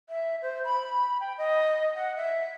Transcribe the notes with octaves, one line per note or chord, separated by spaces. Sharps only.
E5
C5
B5
G5
D#5
F#5
E5